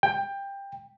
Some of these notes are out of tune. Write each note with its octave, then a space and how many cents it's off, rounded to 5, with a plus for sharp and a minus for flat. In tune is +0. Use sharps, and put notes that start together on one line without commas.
G5 +20